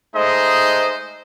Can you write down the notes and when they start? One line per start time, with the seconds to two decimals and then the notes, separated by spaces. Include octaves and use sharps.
0.15 G#3 A3 D#4 C5 D#5